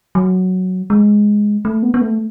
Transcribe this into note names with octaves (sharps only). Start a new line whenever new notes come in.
F#3
G#3
A3
B3
B3
A3